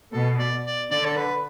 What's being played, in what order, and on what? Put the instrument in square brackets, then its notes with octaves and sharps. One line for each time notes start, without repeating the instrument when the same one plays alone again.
[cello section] B2 [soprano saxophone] A4
[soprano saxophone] D5
D5
[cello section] D3 [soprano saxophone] D5
[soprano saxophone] A4
B4